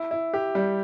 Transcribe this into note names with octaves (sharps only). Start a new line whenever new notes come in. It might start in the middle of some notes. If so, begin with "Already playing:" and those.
Already playing: E4
E4
G4
G3